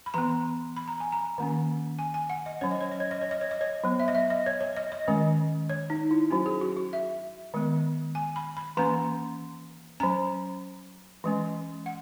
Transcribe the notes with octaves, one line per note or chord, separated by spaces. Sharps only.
B5
E3 B3 A#5
B5
A#5
G#5
A#5
D#3 A#3 C#4
G#5
G#5
F#5
D#5
F#3 C#4 C#5
D#5
C#5
D#5
C#5
D#5
C#5
D#5
C#5
D#5
C#5
F#3 B3
E5
D#5
E5
D#5
C#5
C#5
D#5
D#5
D#3 G#3 C#4
C#5
D#4
E4
F#3 C#4 F#4
G#4
F#4
F#4
E5
D#3 G#3 B3
G#5
B5
B5
E3 A#3 C#4 A#5
F#3 C#4 A#5
E3 G#3 C#4
F#5